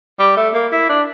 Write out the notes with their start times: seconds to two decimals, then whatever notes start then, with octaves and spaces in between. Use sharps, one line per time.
0.19 G3
0.36 A3
0.54 A#3
0.72 E4
0.89 D4